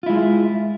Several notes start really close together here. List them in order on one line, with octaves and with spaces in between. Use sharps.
F4 E4 G#3